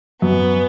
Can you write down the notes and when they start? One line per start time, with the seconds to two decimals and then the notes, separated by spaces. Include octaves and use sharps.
0.22 F#2 B3